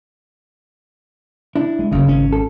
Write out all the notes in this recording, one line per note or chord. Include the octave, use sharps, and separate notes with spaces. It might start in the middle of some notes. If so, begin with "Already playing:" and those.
D4 E4
G#3
F#1 D2 C#3
G#1 C#4
A4